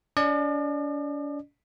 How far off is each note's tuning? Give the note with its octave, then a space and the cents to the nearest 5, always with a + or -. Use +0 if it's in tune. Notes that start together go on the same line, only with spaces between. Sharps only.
D4 -45 D5 +45